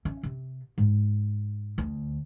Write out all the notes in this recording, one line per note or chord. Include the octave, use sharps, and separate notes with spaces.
C#4
C3
G#2
D2